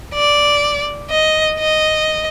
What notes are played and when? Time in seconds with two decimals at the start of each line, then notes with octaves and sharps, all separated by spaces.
0.14 D5
1.10 D#5
1.59 D#5